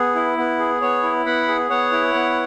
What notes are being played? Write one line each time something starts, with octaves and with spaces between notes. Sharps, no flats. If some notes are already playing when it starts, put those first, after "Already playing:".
Already playing: B3 G#4
E4
B3
G#4
B3 C#5
E4
B3 F#5 B5
G#4
B3 C#5 F#5
E4
B3